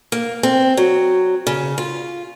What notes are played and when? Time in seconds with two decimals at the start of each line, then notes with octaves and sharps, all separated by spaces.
0.12 A#3
0.43 C4
0.77 F#3
1.47 C#3
1.78 F4